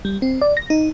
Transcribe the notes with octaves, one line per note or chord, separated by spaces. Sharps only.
G3
C4
D5
A#6
D#4